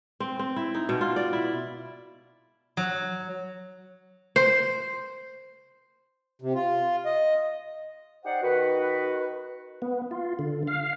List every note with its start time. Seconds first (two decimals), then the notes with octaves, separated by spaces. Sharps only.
0.20 C4
0.39 C4
0.56 E4
0.74 D#4
0.89 B2
1.01 F4
1.16 D5
1.33 E4
2.77 F#3
4.36 C5
6.42 C3
6.55 F4
7.06 D#5
8.24 D#4 G4 C5 D5 F#5
8.42 D#3 F#4 B4
9.82 B3
10.11 F4
10.39 D3
10.67 F5